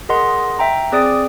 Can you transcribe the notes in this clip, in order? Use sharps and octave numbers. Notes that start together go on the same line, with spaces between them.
G#4 A#4 D#5 F#5 C6
E5 G5 A#5
C4 G#4 D5 D#6 A6 D7